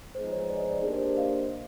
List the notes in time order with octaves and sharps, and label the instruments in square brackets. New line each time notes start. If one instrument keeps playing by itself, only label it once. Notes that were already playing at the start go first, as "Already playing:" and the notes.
[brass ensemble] F3 G#3 B3 D#4 G#4 [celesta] C5
[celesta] C#5
D5
D#5
C5 D5
[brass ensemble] A#3 D4 G4 C5
[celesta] D#5 F5